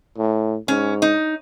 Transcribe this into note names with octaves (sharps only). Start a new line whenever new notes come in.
A2
G#2 C#4
D#4